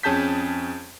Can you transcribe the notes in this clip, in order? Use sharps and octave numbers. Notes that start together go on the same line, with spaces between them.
F2 C#4 G#4 A5 G6 B6